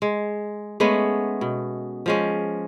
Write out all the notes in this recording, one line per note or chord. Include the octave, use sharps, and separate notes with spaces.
G#3
G#3 A3 B3 C#4
B2
F3 G#3 C#4